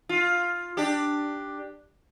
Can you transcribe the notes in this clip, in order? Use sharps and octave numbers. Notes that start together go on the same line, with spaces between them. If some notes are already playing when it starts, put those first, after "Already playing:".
F4
D4 G4